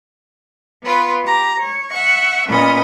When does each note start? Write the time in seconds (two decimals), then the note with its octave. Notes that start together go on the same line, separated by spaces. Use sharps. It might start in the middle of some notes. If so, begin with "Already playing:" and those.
0.82 B3 F4 B4
1.23 G4 A#5
1.58 C#5
1.90 E5 F#5 C#6
2.47 A#2 B3 C#4 D#5 B5